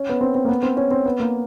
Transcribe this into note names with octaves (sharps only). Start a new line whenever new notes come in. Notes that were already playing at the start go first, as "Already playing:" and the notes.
Already playing: C#4
B3
C4
C4
A#3
B3
C4
C#4
C4
B3
A#3